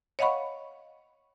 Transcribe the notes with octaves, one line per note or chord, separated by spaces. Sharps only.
C#5 D#5 F5 F#5 B5 C#6